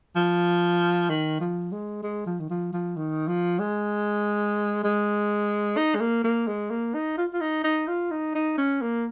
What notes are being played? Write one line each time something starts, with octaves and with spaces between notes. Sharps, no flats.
F3
D#3
F3
G#3
G#3
F3
D#3
F3
F3
D#3
F3
G#3
G#3
D#4
G#3
A#3
A#3
G#3
A#3
D#4
F4
F4
D#4
D#4
F4
D#4
D#4
C#4
A#3